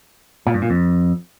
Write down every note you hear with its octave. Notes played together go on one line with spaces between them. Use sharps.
A#2
G2
A#2
F2